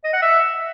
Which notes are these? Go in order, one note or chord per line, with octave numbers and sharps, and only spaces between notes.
D#5
F#5
E5